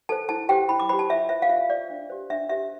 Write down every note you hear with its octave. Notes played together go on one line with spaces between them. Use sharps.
A4 C5 A5
E4 A5
G4 C5 G5
E4 B5
D6
G4 C5 B5
A5
F4 E5
C5 E5
F5
F4 E5
C5 D5
D4
G4 C5
D4 E5
G4 C5 E5